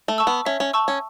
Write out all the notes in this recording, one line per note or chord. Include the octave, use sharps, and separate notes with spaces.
A3
A5 C#6 E6
B3
C#4 E5
C#4
A5 C#6 E6
C#4